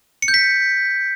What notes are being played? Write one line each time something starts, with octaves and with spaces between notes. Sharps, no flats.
C#7
G6
B6